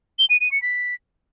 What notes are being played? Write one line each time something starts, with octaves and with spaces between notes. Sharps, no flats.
G7
D#7
D#7
C#7
B6